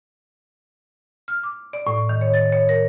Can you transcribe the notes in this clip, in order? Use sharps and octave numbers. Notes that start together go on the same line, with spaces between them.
F6
D6
D5
A2
D#3
C#5
A6
C#5
A#4